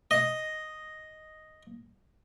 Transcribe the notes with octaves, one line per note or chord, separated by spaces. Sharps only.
D#5